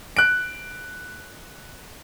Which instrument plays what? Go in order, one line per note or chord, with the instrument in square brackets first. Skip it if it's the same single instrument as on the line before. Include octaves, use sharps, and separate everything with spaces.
[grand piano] F#6 D7